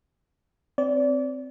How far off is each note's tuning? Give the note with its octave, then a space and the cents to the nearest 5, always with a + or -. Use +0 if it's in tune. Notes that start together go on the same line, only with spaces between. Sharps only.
C4 -5 D5 -30